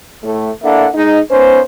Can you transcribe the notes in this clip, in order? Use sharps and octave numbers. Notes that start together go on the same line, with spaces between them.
A2 A3
A#3 D4 E4 A4 E5 F#5
G#3 D#4
B3 C#4 D#4 C5